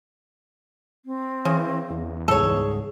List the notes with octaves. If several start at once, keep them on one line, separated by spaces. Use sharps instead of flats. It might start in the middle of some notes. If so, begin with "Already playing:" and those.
C4
C#3 E3
E2
C#2 G#2 G3 G#4 A4 C#5